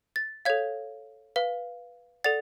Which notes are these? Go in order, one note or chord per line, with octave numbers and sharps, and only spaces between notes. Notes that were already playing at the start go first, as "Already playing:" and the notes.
A6
A4 C#5 F5 G#6
B4 F5
A4 D5 F#5 A6